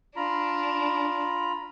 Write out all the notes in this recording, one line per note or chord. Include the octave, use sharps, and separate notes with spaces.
D4 F4 A#5 B5